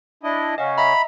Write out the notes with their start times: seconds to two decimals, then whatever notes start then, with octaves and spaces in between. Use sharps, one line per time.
0.23 D4 E4 D#5
0.58 C#3 C#4 D#5 F5 F#5
0.78 D#5 E5 A#5 B5